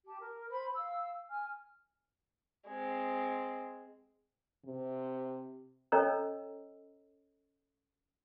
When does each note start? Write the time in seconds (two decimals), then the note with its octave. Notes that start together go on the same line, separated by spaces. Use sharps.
0.06 G4 A5
0.20 A#4
0.51 C5 B5
0.76 F5 E6
1.29 G#5 F6
2.67 G#3 C4
4.65 C3
5.92 C#4 A4 C#5 D#5 A#5 E6